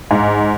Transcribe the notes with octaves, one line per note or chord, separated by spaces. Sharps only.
G#2